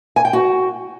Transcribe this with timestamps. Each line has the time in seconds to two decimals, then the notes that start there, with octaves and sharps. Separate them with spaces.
0.16 G#5
0.25 G5
0.33 F#4